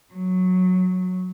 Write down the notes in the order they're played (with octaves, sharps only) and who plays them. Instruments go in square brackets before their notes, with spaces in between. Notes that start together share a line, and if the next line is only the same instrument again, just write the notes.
[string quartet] F#3